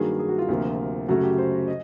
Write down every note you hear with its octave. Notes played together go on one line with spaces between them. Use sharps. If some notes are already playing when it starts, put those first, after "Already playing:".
Already playing: G2 D#3 F#3 A#3 G#4
G#4
F#4
F4
D2 C3 F3 A#3
F#2 C#3 F#3 A3 F#4
G4
C5
D#5